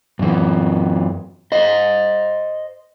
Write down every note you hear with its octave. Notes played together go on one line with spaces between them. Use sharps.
F#2 E3
C5 D#5